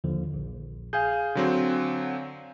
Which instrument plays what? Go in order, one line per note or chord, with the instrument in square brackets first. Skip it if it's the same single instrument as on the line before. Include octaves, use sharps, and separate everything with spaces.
[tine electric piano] D#2 D3 F3
A#1
[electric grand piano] G#4 [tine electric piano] F5 G#5 G6
[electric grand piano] D3 F#3 C4